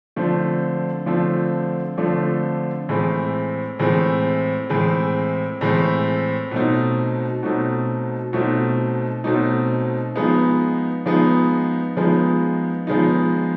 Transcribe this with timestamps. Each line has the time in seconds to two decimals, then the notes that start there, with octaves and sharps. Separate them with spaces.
0.16 D3 F3 A3 C4
1.06 D3 F3 A3 C4
1.97 D3 F3 A3 C4
2.89 A2 E3 G#3 C4
3.79 A2 E3 G#3 C4
4.69 A2 E3 G#3 C4
5.61 A2 E3 G#3 C4
6.51 B2 F#3 A3 C4 D#4
7.43 B2 F#3 A3 C4 D#4
8.33 B2 F#3 A3 C4 D#4
9.24 B2 F#3 A3 C4 D#4
10.15 F3 G#3 B3 D#4
11.06 F3 G#3 B3 D#4
11.97 F3 G#3 B3 D#4
12.87 F3 G#3 B3 D#4